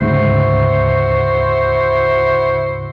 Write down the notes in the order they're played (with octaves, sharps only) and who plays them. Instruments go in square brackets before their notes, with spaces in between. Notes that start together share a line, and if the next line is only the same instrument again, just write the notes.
[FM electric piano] D2 G#2 C#3 [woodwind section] E4 F#4 C5